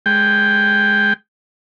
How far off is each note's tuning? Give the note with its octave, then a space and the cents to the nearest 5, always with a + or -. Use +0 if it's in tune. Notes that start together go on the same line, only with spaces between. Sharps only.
G#3 +0 G5 +5